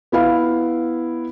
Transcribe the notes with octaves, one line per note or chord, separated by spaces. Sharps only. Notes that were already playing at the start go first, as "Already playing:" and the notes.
B3 E4 F5